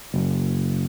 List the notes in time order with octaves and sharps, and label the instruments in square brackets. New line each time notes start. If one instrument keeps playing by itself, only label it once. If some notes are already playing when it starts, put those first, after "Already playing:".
[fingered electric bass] F#1